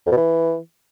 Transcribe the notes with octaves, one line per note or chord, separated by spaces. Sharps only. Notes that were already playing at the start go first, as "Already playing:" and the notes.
F2
B2
E3